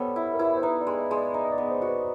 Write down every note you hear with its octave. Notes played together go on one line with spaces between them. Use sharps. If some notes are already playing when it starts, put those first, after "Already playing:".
Already playing: G3 B3 A4 C5 C#5
E4
A#4
E4 B4
C5
D#4 B4
D5
G#3
D#5
G#3
D5
D#4 D#5
D#5
D5
B3
C5
F#4
B4